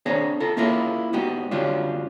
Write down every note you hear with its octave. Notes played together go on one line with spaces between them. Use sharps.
C4 D4 G#4 C5 C#5 A#5
F4 A4 A#5
A#3 C#4 E4 F4 G#4 A#4
G#2 B3 D#4 F#4 G4
F#2 D3 G3 C#4 D4 F4